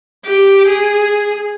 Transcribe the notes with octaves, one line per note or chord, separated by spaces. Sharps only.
G4
G#4